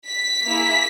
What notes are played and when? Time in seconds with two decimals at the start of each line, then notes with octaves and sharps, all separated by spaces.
0.08 B6
0.45 A#3 E4 G#4